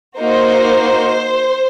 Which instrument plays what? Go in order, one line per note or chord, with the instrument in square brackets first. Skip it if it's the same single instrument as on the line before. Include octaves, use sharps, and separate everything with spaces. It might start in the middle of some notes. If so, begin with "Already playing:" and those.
[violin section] A#3 D#4 F#4 C5